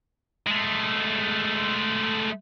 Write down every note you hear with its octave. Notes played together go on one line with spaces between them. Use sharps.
G#3 A3